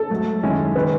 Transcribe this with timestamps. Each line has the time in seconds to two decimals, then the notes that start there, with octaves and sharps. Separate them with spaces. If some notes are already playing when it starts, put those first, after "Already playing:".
Already playing: A4
0.10 G#2 F#3 A3
0.43 F#2 D#3 G#3 C#4 E4
0.76 D#3 G#3 B4